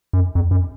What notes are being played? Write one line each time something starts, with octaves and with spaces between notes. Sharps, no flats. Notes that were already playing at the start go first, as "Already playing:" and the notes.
F#2
F2
F#2